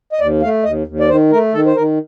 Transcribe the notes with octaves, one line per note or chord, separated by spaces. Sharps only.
D#5
D#2 D5
A3 F5
D#2 D#5
D#2
D5
D#3 C5
A3 A#4
D#3 A4
C5
D#3 A#4